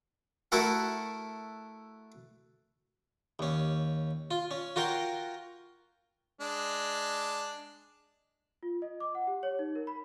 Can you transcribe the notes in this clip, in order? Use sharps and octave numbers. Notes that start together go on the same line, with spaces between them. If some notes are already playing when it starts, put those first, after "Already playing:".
A3 E4 F#4 A4 A#4 F#5
D#2 C#4
F4
C#4
F4 F#4 A#4 F5 G5
G#3 D4
F4
D#5
D6
F#5
G4
C#5
D#4
A#4
B5